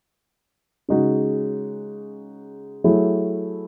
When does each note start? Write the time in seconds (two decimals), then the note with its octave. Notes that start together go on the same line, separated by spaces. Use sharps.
0.89 C#3 G#3 D#4 F#4
2.84 F#3 A3 E4 G#4